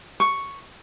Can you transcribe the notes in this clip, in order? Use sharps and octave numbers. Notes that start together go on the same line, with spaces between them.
C#6